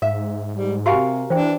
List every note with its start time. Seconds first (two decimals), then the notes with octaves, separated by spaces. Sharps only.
0.02 G#2 E5 F5
0.54 G3
0.86 C3 F#4 G4 A#4 F5 F#5 G#5
1.30 E3 D4 C5 G5